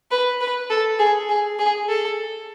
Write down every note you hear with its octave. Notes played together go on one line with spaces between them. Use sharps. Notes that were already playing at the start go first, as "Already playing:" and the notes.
B4
B4
A4
G#4
G#4
G#4
A4